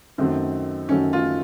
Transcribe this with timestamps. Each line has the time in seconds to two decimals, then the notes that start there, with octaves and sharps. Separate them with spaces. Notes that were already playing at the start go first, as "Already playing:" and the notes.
0.18 F#2 D#3 F#3 A3 C4
0.88 F#2 D#3 F#3 A3 C#4
1.13 F4